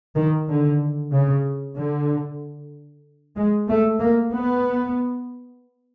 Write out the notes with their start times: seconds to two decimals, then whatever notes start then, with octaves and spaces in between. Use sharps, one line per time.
0.15 D#3
0.49 D3
1.12 C#3
1.75 D3
3.36 G#3
3.68 A3
3.99 A#3
4.31 B3